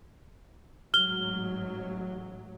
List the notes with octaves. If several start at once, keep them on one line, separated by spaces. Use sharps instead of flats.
A1 G#2 F#3 F6 G7